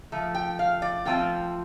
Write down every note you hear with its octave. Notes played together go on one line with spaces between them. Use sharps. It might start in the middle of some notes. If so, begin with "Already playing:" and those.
F3 A3
G5
F5
D5
F3 A3 C4 F4 G5